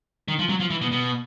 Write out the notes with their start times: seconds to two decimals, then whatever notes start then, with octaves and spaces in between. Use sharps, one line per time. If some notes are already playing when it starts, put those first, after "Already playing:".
0.28 D#3
0.39 F3
0.49 F#3
0.60 F3
0.70 E3
0.81 B2
0.92 B2